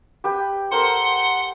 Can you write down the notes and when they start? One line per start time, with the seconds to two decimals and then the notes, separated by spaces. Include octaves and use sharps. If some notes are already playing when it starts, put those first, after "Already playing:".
0.24 G4 B4 G5
0.71 A4 A#4 C5 F#5 C6